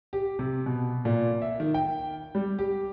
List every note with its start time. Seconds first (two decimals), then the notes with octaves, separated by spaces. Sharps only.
0.13 G4
0.39 C3
0.66 B2
1.05 A#2
1.42 E5
1.60 D#3
1.74 G5
2.35 G3
2.59 G4